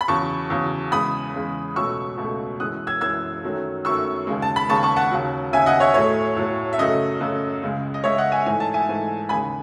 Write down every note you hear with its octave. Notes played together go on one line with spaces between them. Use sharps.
B5
E2 C#3 F#3 A5 C#6
E2 C#3 F#3
E2 C#3 G#3 B5 D#6
E2 C#3 G#3
C#2 B2 F#3 A3 C#6 E6
C#2 B2 F#3 A3
F#2 E3 G#3 D#6 F#6
E6 G#6
F#2 E3 G#3 E6 G#6
F#2 D#3 F#3 A3
F#2 D#3 F#3 A3 C#6 E6
D#2 C#3 G#3
A5
B5
D#2 C#3 G#3 A5 C#6
A5 C#6
F#5 A5
D#2 C#3 F#3
D#2 C#3 F#3 E5 G#5
D#5 F#5
C#5 E5
A2 F#3 A3 C#5
A2 F#3 A3
E5
F#2 C#3 F#3 A3 D#5
F#2 C#3 F#3 A3
C#2 C#3 G#3
D#5
C#2 C#3 G#3 C#5 E5
D#5 F#5
E5 G#5
G#2 E3 A3 G#5
A5
E5 G#5
G#2 E3 A3
D#2 C#3 G#3 G#5 B5